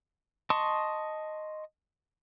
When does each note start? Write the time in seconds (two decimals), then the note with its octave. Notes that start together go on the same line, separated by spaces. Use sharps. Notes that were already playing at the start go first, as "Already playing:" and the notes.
0.50 D#5 A5 C6 C#6